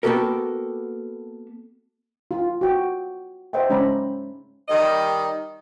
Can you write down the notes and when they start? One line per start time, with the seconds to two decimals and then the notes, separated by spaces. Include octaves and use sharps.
0.03 A#3 B3 F#4 G4 A4 A#4
2.31 F4
2.61 F#4 G5
3.53 C5 D#5 E5 F#5 G5
3.70 G#3 C#4 C5 D5 A#5 B5
4.69 D#3 G3 D#5